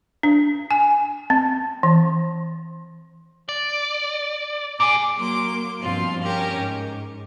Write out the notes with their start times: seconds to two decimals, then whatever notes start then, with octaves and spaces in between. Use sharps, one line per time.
0.23 D4
0.71 G#5
1.30 C4
1.83 E3
3.49 D5
4.80 A#2 G#4 D6
5.17 F#3 A#3 C6 D6
5.81 G2 B2 F3 C4 F4 C6
6.22 C#4 G4 A#4
6.55 G#2